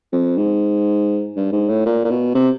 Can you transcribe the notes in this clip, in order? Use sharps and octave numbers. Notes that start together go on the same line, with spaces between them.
F2
G#2
G2
G#2
A2
A#2
A#2
B2
C3